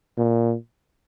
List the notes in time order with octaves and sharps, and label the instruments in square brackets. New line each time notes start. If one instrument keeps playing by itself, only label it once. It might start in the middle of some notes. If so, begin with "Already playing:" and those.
[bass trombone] A#2